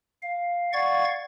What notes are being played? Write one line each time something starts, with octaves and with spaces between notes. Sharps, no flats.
F5
D5 F5 F#5 C#6 G#6 A6